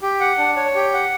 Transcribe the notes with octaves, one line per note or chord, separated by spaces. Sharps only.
G4
F#5
D4
C#5
G4
F#5